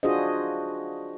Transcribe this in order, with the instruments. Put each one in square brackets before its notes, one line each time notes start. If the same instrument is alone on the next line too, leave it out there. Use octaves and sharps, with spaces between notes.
[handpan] D4 F4 F#4 G#4 C5 D#5